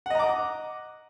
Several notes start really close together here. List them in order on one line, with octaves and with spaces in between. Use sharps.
F#5 D#5 A#5 D6